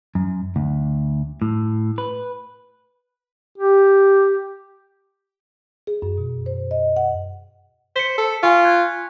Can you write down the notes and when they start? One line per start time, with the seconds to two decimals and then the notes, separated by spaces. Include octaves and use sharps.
0.15 F#2
0.56 D2
1.42 A2
1.98 B4
3.58 G4
5.87 G#4
6.02 F#2
6.18 B2
6.46 C5
6.71 D#5
6.97 F#5
7.96 C5 B6 C#7
8.18 A4
8.43 F4 G#5 C#6
8.65 F#6 G#6